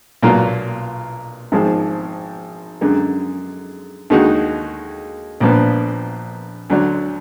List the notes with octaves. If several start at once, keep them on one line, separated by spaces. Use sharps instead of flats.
B1 A#2 F#3 A#3 F4
G#1 G#2 F3 G#3
F#2 D3 G#3
D#2 D3 G#3 D#4 F#4
A#1 A#2 F3 B3
D2 D3 F#3 D4